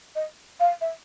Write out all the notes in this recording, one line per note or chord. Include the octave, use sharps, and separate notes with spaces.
D#5
F5
E5